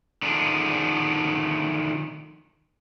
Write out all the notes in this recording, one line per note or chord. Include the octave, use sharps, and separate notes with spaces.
D3 D#3 F3 A3 D4 G#4